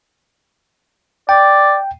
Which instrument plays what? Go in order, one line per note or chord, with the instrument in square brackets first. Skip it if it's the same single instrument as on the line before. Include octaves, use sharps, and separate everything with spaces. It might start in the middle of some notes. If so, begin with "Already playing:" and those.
[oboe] D5 [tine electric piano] G5